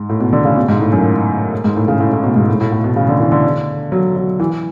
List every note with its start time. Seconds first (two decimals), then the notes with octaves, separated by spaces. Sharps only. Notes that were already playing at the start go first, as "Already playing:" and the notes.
Already playing: G#2
0.09 A2
0.20 B2
0.33 D3
0.45 C#3
0.56 B2
0.69 G#2
0.81 A2
0.92 F#2
1.64 G#2
1.76 A2
1.88 C#3
2.00 A2
2.13 A2
2.24 B2
2.36 G#2
2.48 A2
2.61 A2
2.72 A2
2.84 B2
2.96 C#3
3.09 D3
3.20 E3
3.32 D3
3.92 F#3
4.16 F#3
4.40 E3